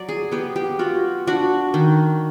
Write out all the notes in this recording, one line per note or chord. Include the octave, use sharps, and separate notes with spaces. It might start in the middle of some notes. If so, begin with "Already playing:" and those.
Already playing: F#3 D5
G#4
B3 G4
G4
F4 F#4
D4 F#4
D#3